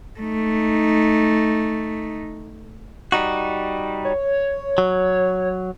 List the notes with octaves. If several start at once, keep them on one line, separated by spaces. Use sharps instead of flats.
A3 D#4
G3 D#4 F#4
C#5
F#3